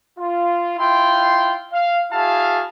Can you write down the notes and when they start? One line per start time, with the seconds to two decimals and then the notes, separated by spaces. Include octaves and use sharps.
0.19 F4
0.79 E4 F4 G5 C6
1.72 F5
2.12 E4 F#4 G#4 F5 A5